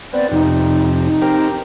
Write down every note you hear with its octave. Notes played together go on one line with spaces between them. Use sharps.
B3 C4 D5
F2 C3 D#4
D#4
C4 G4 A#4